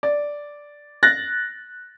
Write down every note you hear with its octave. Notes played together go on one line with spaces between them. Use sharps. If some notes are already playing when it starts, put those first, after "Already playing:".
D5
F#6 A6 A#6